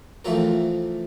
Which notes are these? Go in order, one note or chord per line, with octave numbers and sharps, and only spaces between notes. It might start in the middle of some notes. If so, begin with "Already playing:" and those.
E3 F3 A3 C4 F4 A#4